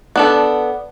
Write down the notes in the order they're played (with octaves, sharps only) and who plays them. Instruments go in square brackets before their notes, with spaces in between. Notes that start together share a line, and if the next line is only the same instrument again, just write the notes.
[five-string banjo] B3 D4 A4